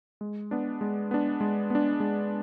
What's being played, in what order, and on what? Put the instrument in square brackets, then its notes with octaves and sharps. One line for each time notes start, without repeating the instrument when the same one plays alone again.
[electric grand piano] G#3
B3 D4
G#3
B3 D4
G#3
B3 D4
G#3